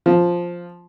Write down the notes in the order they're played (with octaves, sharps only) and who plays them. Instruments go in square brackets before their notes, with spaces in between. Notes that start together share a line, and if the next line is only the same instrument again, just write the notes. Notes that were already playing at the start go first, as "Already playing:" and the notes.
[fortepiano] F3